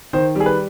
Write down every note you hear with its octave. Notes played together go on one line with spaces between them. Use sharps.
D#3 C5
G3 G#4
B4